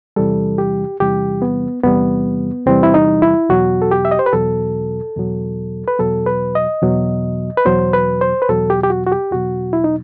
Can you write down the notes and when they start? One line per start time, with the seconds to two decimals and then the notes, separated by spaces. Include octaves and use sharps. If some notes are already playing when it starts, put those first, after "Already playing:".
0.16 E2 C3 E3 G3 A4
0.58 G4
1.00 E2 C3 E3 G3 G4
1.42 B3
1.83 E2 C3 E3 G3 B3
2.66 E2 C3 E3 G3 C4
2.83 E4
2.94 D#4
3.22 E4
3.50 E2 B2 F#3 F#4
3.82 A4
3.91 G4
4.05 E5
4.11 D#5
4.19 C5
4.26 B4
4.33 E2 B2 F#3 A4
5.16 E2 B2 F#3
5.88 B4
5.99 E2 B2 F#3 A4
6.26 B4
6.55 D#5
6.82 E2 B2 F#3
7.57 B4
7.65 E2 B2 F#3 C5
7.93 B4
8.21 C5
8.42 B4
8.48 E2 B2 F#3 A4
8.70 G4
8.84 G4
8.90 F#4
9.07 F#4
9.12 G4
9.32 E2 B2 F#3 F#4
9.73 E4
9.84 D#4